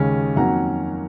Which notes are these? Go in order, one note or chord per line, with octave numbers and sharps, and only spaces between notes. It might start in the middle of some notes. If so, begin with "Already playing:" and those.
Already playing: D#2 C#3 G#3 C#4
F2 D#3 F#3 A#3 C#4 F#5 A#5